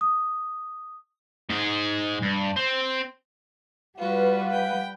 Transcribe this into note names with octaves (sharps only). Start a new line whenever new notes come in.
D#6
G#2 G#4
G2
C4
G3 F4 F#4 B4 F5 F#5
G5